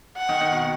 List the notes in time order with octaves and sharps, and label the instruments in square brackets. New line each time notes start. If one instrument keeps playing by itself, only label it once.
[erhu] F#5
[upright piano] D#3
D#3
B2